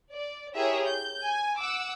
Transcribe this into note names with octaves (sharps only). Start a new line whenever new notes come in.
D5
E4 G4 G#4 A#4 C#5 E5
G6
G#5
F#5 D6 E6